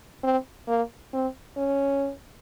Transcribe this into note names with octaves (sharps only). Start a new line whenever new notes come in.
C4
A#3
C4
C#4